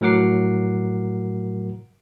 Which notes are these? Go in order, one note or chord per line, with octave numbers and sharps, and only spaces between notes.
A2 F#3 A#4 F#5 D6 C7